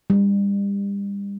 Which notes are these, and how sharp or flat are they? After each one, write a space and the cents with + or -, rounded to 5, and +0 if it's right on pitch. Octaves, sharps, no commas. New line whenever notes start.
G3 +35